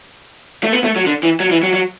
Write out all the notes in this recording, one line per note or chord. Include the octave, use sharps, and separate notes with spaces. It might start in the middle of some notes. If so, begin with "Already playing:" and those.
A3
B3
A3
F#3
D3
E3
F#3
E3
F#3
F#3